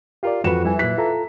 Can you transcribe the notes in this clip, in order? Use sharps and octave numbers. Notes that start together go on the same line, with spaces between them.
F4 G4 A#4 D5
F2 E3 F#4 B4 E7
E3 G3 E4 G#5
A#2 F#3 F#6 B6
F4 A4 A#5